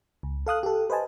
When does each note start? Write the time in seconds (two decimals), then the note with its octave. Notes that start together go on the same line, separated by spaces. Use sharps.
0.23 C#2
0.47 A4 F5 D#6 F#6
0.63 G4 A4
0.90 B4 C5 D#5 G#5 A5